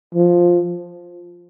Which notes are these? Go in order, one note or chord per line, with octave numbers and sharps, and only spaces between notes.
F3